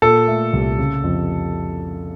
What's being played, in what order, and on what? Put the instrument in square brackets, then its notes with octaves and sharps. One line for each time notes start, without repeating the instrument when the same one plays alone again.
[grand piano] A#2 A4
A3
C2
C#3
F2